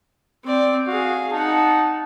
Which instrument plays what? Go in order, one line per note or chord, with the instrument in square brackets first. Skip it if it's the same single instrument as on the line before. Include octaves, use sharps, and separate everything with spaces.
[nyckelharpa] C4 D5
[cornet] F#4 [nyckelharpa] G#4 F5
[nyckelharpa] D#4 F#5 [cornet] A5